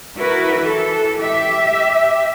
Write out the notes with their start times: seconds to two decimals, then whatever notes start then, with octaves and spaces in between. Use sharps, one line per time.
0.17 E4 F#4 A#4 B4
0.58 E3 A4
1.20 G4 E5